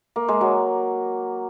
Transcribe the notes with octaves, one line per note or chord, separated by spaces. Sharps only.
A#3
G#3
F#3